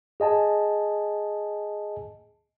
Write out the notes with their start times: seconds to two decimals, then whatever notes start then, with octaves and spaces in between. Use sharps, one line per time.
0.20 G#4 D#5 G#5 A5